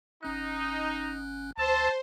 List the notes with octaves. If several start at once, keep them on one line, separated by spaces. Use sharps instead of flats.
G1 C#4 D#4 F#6
D2 C5 A5 E6